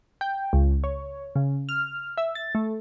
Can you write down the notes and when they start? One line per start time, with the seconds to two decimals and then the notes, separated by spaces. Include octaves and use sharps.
0.21 G5
0.53 C#2
0.84 C#5
1.36 C#3
1.69 F6
2.17 E5
2.35 A6
2.55 A3